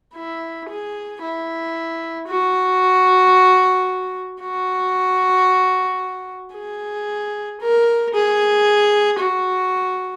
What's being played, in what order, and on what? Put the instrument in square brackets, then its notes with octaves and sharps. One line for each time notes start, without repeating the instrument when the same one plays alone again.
[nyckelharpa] E4
G#4
E4
F#4
F#4
G#4
A#4
G#4
F#4